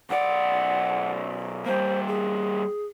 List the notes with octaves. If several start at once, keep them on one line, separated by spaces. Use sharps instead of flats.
B1 D5 F#5
G3 A#3 C5
G#4